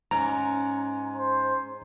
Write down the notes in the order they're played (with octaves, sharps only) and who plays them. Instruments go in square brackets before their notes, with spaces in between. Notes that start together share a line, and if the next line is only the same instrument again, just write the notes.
[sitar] G#2 [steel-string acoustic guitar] C#4 [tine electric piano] A#5
[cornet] C5